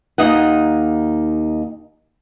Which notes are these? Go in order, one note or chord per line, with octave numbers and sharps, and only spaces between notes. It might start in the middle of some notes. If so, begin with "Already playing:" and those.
D#2 D#4 D#5 F#5